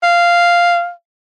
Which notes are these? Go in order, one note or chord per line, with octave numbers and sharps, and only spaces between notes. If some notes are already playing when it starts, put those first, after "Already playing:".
F5